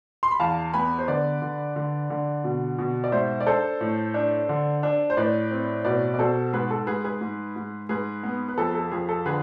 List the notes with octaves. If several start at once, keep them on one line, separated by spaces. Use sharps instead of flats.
C6
B5
E2 F5 A5
B3 G#5 B5
C5
D3 B4 D5
D3
D3
D3
B2
B2
D5
G#2 C5 E5
D5
D4 A4 C5
A2
D4
D3
D4
C5
A2 B4 D5
C4
B2 B4 D5
D5
B2 A4 C5
G#2 G#4 B4
A4
G#2 G#4 B4
G#4 B4
G#2
G#2
G#2 G#4 B4
B3
B4
F2 A4
A4
F2 G#4
A4
D3 G#4 B4